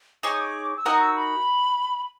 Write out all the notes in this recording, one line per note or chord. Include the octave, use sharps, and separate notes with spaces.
D#4 G#4 C#5 D6
D#6
D6
E6
D#4 F#4 A#4 D#6
E6
B5